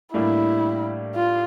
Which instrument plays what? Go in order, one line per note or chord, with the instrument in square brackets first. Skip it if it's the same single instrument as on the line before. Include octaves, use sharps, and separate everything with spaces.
[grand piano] A2 G3 A#3 D4 G4 [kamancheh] E4
[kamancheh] F4